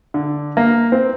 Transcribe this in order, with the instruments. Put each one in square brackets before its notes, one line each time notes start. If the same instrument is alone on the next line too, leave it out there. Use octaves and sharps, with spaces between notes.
[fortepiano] D3
A#3
C4